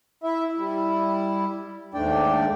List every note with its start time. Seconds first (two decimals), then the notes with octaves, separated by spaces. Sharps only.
0.23 E4 E5
0.57 G3 E4
1.94 D#2 G#2 A3 D4 D5 G5